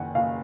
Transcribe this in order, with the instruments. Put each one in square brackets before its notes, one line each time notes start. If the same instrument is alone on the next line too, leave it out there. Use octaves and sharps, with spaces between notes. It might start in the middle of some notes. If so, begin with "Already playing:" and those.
Already playing: [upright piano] F#1 D#3 [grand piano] F#5 G#5
[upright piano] F#1 [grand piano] F5